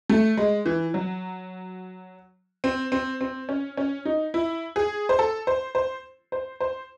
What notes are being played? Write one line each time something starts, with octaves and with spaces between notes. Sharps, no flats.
A3
G#3
E3
F#3
C4
C4
C4
C#4
C#4
D#4
E4
G#4
C5
A4
C5
C5
C5
C5